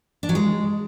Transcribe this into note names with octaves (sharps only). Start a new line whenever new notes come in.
D4
F#3
G#3